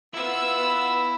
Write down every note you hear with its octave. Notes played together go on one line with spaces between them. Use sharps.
B3 E4 F4 E6